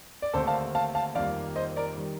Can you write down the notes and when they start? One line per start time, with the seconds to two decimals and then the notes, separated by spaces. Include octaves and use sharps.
0.22 D5
0.34 D#2 D3 A3 C4 A4 C5
0.47 F5 A5
0.75 F5 A5
0.95 F5 A5
1.15 F2 D#3 G3 A#3 D5 F5
1.56 C5 D#5
1.76 A#4 D5
1.97 D#3 G3